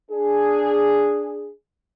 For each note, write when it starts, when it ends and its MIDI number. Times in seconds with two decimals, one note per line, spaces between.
0.11 1.50 62
0.11 1.50 68